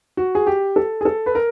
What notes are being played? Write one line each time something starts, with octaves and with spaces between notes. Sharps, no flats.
F#4
G#4
G4
A4
G#4
A4
B4
A#4